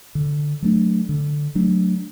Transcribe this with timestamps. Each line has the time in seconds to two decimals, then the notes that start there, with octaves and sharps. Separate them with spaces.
0.15 D3
0.62 F#3 A3 D4
1.09 D3
1.55 F#3 A3 D4